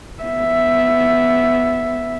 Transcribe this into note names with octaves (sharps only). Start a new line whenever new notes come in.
B3 E5